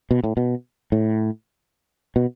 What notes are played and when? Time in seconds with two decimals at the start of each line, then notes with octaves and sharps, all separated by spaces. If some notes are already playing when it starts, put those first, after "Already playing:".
0.11 B2
0.24 A2
0.37 B2
0.92 A2
2.16 B2